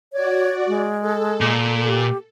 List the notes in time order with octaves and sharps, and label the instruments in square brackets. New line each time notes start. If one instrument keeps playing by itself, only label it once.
[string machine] F#4 D5 [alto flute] C#5
[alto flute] G#3
[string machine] A4
[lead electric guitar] A#2
[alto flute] G4